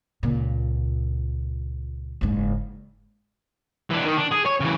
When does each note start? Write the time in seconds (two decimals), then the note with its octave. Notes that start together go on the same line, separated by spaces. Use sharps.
0.23 C#2 A#2
2.21 F#1 G#2
3.91 E3 D4
4.06 D#3
4.18 D4
4.32 G#4
4.46 C#5
4.61 C#3 E3